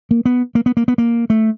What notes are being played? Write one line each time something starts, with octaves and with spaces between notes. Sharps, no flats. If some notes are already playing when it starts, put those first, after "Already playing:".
A#3
B3
A#3
B3
A#3
B3
A#3
A3